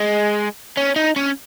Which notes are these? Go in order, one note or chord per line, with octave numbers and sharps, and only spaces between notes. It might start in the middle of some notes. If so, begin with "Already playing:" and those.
Already playing: G#3
C#4
D#4
C#4